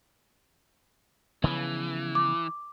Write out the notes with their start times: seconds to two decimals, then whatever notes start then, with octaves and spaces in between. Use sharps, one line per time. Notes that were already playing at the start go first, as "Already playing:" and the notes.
1.44 C#3 E3 F3 B3
2.15 D6